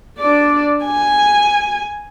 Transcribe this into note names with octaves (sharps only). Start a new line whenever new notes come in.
D4 D5
G#5